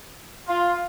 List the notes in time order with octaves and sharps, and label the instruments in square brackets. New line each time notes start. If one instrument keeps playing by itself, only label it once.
[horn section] F4